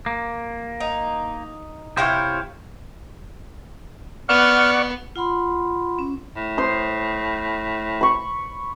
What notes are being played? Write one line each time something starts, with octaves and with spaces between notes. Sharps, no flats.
A#3
D#4
C3 E4 F4 C5 C#5
B3 D5 F#5 C#6 F6
F4 F#5 B5 C6
C#4
A2
C5 C6 D#6
B5 C#6